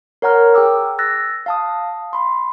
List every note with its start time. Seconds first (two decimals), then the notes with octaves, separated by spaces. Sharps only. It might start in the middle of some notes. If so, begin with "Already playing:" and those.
0.22 A#4 C#5 F#5 A#5 F6
0.54 G#4 G5 D6 E6
0.99 E6 F#6 A6 A#6
1.46 F5 A5 D#6
2.13 B5 C6